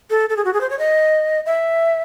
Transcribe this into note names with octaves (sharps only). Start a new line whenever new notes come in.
A4
A4
G#4
F#4
G#4
C5
C#5
D#5
E5